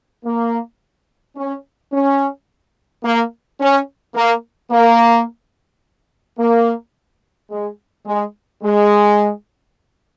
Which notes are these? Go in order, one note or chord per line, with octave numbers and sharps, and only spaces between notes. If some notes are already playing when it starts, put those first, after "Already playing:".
A#3
C#4
C#4
A#3
C#4
A#3
A#3
A#3
G#3
G#3
G#3